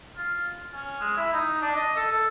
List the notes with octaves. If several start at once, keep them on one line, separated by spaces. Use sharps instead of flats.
F4
C#4
G#3
E4
D#4
D4
D#5
A4
A4